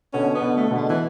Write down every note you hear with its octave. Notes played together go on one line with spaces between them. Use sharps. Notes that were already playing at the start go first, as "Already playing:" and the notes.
B2 D3 C#4
B3
B2 D3
A3
B2 D3
G#3
E3